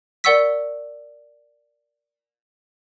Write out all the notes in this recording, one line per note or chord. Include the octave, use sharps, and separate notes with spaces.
A#4 D5 F#5 C#6 E6 B6